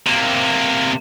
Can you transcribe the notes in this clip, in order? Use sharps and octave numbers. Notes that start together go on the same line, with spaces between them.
C3 A#3